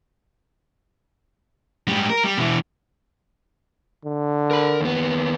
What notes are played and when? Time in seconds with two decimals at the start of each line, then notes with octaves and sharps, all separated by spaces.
1.88 G#2 G3
2.10 A#4
2.24 G3
2.38 B2 E3
4.05 D3
4.51 A#4 B5
4.81 D#2 B3